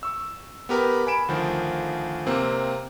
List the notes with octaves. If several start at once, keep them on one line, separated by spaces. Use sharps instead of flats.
C#6 E6
B3 G4 A#4 B4
G#5 B5 D7 E7
D2 D#3 F3
C3 A#3 C4